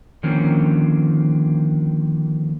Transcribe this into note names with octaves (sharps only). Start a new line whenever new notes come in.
D3 D#3 F3 A#3 C4 C#4